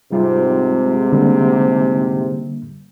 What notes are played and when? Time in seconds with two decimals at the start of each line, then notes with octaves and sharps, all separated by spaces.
0.12 G#2 C3 G3 F4
1.12 D3 G3 A#3